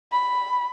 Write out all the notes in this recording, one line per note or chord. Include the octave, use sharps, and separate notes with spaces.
B5